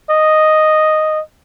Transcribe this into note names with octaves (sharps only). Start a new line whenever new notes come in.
D#5